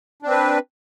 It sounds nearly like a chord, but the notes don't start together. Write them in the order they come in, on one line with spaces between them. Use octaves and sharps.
D4 C4 B4